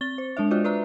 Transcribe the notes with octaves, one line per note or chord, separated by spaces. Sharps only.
C4 A6 G7
C5
G#3 D4 C#5 E5
F4 F#4 C5 D5 D#5
B4 D5 E5 A#5